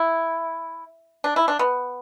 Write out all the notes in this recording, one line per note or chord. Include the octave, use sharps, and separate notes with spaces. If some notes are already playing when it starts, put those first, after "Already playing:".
Already playing: E4
D4
E4
D4
B3